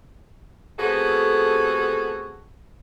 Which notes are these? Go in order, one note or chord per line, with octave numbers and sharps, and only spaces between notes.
C3 A3 B3 F#4 G#4 A4